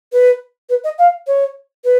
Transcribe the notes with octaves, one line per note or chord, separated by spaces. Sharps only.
B4
B4
D#5
F5
C#5
B4